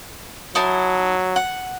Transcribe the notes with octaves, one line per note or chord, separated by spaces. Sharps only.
F#3 D#4 E4 A5
F#5